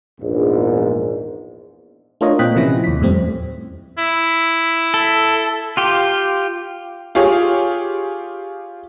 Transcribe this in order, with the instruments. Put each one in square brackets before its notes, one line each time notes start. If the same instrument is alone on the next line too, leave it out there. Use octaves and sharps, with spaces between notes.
[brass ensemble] A#1 E2 G#2
[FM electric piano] A3 D4 F4 A#4 C#5 D#5
A#2 C4 D#5 G5 F#6 B6
C3 E3 F3 C#4 E4 A#6
D#2 B6
F2 A2 G3 A3 C4
[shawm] E4
[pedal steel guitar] A4
F4 G4
[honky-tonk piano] F4 G4 G#4 C#5